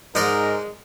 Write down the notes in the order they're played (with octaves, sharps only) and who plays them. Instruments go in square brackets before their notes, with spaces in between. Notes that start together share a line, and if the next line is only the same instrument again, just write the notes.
[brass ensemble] G#2 [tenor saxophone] G#3 [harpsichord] D#4 D5 A#5 [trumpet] A#4